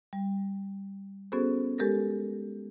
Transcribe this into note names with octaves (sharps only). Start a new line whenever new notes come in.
G3
B3 C#4 F#4 G#4 A4 C5
G#3 G4 A4 A#4 A#6